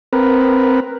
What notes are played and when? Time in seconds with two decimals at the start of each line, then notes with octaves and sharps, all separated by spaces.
0.13 C4 A#4 B4